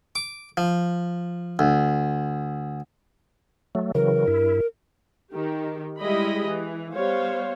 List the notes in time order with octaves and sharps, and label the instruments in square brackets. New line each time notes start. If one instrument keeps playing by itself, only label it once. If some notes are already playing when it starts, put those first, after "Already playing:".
[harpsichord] D6
F3
D2
[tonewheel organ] F#3 A3
[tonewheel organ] C#3 E3 F#3 [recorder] A#4
[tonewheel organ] G2 E4
[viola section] D#3 G4
G3 G#3 E4 G4 D#5 B5
E3
G3 B3 C5 C#5 F5